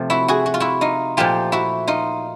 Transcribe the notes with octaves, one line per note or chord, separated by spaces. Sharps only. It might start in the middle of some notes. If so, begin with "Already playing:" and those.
Already playing: C3 F3 A3
E4 F#4
F#4 G#4
F#4
F4
E4 F#4
D#4 F4
A#2 F3 A3 F4 G4
E4 F#4
D#4 F4